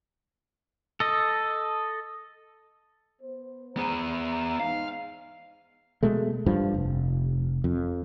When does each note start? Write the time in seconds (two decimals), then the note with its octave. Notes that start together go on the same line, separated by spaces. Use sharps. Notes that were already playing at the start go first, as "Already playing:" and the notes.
1.00 A4 D#5
3.21 B3 C5
3.77 B3 G#4 A#5
4.60 G#2 F5
6.03 B2 G#3 A3
6.46 G2 F3
6.74 F1
7.64 F2